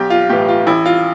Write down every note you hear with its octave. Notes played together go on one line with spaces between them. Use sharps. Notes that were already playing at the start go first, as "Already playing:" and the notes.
Already playing: B1 G4
F4
A2 E3 G4
F4
A1 E4
F4